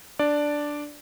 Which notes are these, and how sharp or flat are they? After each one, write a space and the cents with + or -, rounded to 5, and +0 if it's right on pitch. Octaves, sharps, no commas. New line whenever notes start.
D4 +0 D5 +0